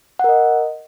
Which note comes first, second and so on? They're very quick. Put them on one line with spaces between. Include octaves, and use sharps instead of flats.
F#5 A#4 D#5